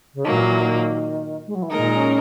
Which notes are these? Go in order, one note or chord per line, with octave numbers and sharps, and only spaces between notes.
C#3
A#2 D#3 F#3 A#3
E3
E3
D#3
G#3
F#3
E3
A#2 D#3 G#3 D#4 A#4
D#3
C#4